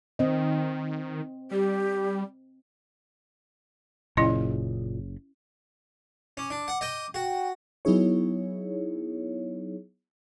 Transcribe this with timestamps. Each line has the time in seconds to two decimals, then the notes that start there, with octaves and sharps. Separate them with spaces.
0.19 D#3 C4 D#5
1.51 G3 G4
4.17 F#1 A#2 C#3 C#4 E4 D#5
6.37 C#4 D6
6.50 D4
6.68 F#5
6.81 D#5 G5
7.14 F#4 G5
7.85 F#3 B3 D#4 E4 G#4 C#5